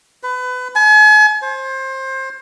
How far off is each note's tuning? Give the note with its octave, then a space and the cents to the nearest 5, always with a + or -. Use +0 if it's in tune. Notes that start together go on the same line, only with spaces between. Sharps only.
B4 +30
G#5 +40
C5 +25